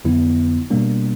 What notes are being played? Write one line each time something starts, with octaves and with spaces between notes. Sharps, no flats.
F2 D3 F#3 B3 E4
B2 G3 A#3 D4